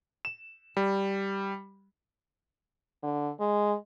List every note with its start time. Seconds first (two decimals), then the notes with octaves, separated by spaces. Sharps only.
0.25 E7
0.77 G3
3.03 D3
3.40 G#3